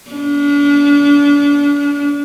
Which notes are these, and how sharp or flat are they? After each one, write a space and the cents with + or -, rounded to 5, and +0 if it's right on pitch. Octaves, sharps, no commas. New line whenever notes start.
D4 -35